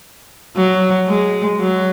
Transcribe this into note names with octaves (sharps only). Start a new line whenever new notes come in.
F#3
G#3
F#3